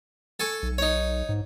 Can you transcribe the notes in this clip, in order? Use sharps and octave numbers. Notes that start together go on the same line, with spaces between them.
A4 G#5 C#6
B1
D#4 C#5
G#2